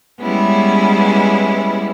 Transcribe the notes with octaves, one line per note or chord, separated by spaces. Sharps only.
G3 G#3 B3 C#4 E4 G#4